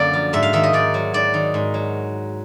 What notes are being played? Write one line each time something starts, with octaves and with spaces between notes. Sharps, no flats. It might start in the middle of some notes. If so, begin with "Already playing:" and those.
Already playing: F#2 D3 A#3 D5
F3
G#2 E5
F5
D#3 E5
D#5
G#2 D5
F#3
G#2 D5
D#3
G#2
F#3